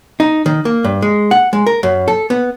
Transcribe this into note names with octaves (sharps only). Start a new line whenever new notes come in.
D#4
D#3
A#3
G2
G#3
F#5
G#3
A#4
F#2
A4
B3